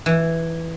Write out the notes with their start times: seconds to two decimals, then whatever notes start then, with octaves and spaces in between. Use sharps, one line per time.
0.06 E3